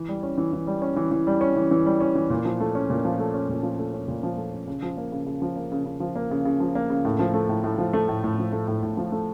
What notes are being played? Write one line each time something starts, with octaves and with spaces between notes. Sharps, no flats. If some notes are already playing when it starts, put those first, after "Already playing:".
Already playing: E3
G3
C#4
E3
E3
G3
C#4
E3
E3
G3
C#4
E3
E3
G3
C#4
E3
A#2
F3
A3
C#4
A#2
F3
A3
C#4
A#2
F3
A3
C#4
A#2
F3
A3
C#4
C#3
F3
A#3
C#3
C#3
F3
A#3
C#3
C#3
F3
A#3
C#3
C#3
F3
A#3
C#3
A2
F3
A3
A2
A2
F3
A3
A2
A2
F3
A3
A2
A2
F3
A3